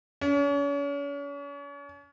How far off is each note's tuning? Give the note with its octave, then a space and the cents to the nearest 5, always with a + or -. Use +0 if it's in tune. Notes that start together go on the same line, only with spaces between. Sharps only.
C#4 +40